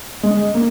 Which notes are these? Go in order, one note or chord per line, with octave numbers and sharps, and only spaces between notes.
G#3
A#3